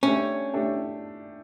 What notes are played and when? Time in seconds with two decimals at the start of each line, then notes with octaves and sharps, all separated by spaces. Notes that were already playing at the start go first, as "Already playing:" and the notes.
0.03 A3 C#4 D4 G4
0.53 A3 D4 G4